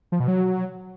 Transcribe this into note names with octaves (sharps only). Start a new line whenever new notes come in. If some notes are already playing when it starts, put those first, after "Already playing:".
F3
B2
F#3